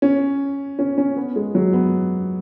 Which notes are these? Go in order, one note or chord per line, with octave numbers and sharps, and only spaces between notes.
C#4
C#4
C#4
B3
G#3
F#3
B3